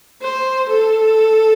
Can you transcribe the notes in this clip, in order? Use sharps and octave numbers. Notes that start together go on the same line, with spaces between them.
C5
A4